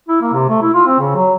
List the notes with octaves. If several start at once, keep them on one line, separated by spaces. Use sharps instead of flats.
E4
A#3
C3
A3
E4
F4
C4
C#3
F#3